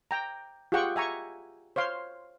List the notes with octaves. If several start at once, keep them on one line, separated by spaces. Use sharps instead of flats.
G5 A#5
F4 G4 G#4 F#5 G5 C#6
E5 G#5 A#5 C#6
C5 C#5 F5 C6